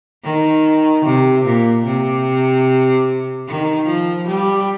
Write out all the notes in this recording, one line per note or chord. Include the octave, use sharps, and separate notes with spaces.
D#3
C3
A#2
C3
D#3
F3
G3